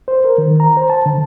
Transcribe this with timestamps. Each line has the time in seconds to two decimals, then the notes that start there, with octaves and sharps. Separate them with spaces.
0.08 C5
0.25 A#4
0.38 D#3
0.60 A#5
0.77 C5
0.90 A5
1.06 D3